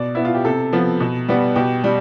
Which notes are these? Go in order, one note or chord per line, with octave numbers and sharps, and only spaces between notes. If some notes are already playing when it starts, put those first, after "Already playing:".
Already playing: B2 D5
B3 E4
F4
G4
C3 A4
F3 B3
B2
G3 B3
B2 G4
G3